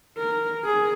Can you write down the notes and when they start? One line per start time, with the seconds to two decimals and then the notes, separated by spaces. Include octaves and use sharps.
0.18 A#4
0.65 G#4